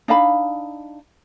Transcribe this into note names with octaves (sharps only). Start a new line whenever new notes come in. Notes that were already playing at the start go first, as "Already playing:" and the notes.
D4 D#4 F5 B5